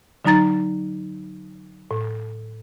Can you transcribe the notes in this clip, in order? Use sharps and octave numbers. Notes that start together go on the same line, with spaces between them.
D3 F#3 D#4 A#5 A6
A2